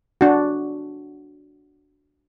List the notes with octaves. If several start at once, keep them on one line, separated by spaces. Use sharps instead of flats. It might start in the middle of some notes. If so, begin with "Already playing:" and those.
D4 F#4